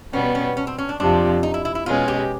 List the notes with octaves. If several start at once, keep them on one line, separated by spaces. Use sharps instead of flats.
B2 G3 B3 C#4
C#4
C#4
C4
C#4
D4
F2 C3 F3 D4
D#4
E4
E4
E4
B2 G#3 C#4 F4
G4